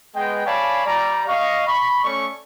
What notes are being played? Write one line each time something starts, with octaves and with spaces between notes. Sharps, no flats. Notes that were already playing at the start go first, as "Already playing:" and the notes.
G#3 B3 D#5 G5
C#5 D5 F5 G#5 A5 B5
G3 D5 A#5
D#5 F5 C#6
B5 C#6
A3 C#4 D5 C#6